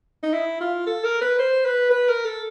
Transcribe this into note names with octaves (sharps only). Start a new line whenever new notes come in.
D#4
E4
F4
A4
A#4
B4
C5
B4
B4
A#4
A4